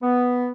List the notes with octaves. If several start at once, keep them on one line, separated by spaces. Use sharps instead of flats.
B3